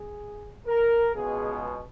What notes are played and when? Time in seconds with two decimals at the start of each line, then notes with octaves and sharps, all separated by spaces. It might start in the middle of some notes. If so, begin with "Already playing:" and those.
Already playing: G#4
0.66 A#4
1.14 C#2 B2 G#3 B3 G#4